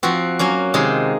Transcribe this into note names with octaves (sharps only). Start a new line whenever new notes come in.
F3 C4 F#4
F#3 A#3 C#4
C3 D#3 G#3 D#4